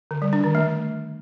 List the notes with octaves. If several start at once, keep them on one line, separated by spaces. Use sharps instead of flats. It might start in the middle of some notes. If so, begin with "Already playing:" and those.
D3
G3
D4
D#3
A3